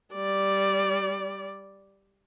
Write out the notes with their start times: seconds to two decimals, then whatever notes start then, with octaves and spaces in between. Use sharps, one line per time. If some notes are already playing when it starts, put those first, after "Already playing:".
0.14 G3 D5